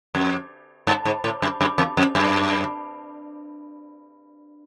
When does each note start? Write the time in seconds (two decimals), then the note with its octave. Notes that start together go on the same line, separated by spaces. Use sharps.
0.15 F2
0.87 G2
1.05 G#2
1.24 A2
1.42 F#2
1.61 F#2
1.78 E2
1.97 F2
2.15 F#2